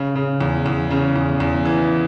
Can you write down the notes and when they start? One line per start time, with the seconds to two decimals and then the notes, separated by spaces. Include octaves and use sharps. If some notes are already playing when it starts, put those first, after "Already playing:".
Already playing: C#3
0.15 C#3
0.41 E2
0.66 E2
0.90 C#3
1.16 E2
1.40 E2
1.65 E3